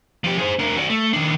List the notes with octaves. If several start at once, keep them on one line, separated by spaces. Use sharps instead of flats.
F3 G4
G#4 C5
D4 A#4
F#4 D5
A3
D#3 D4